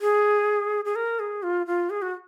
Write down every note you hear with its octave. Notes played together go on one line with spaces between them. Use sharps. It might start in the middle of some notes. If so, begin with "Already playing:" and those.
G#4
G#4
A#4
G#4
F4
F4
G#4
F#4